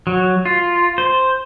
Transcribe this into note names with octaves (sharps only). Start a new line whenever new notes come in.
F#3
F4
C5